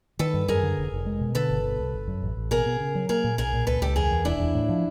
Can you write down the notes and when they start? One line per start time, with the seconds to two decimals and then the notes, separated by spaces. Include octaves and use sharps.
0.19 D#3 A4 B4
0.34 G2
0.48 F#2 G#4 A#4
0.63 D3
0.77 F1
0.92 F1
1.06 G#3
1.21 B2
1.35 D3 A4 B4
1.50 G1
1.64 B2
1.79 C2
1.93 G1
2.08 F#2
2.22 A1
2.37 A1
2.51 B2 G#4 A#4
2.66 B2
2.80 C#3
2.95 F#3
3.09 A#3 G#4 A#4
3.24 A#2
3.38 B1 G#4 A#4
3.53 A#2
3.67 C#2 A4 B4
3.81 C#2 G4 A4
3.96 E2 G#4 A#4
4.11 E2
4.25 E1 D4 E4
4.40 E2
4.54 A2
4.69 F3